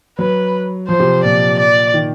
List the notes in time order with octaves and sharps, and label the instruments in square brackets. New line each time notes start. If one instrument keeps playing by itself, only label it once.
[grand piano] F#3 [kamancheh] B4
[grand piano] F3 [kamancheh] C5
[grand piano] C3
[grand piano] A#2 [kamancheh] D5
[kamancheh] D5
[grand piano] D#3